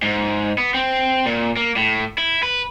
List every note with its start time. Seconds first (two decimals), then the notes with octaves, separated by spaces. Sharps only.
0.03 G#2
0.58 B3
0.74 C4
1.26 A#2
1.57 A#3
1.76 A2
2.18 E4
2.43 B4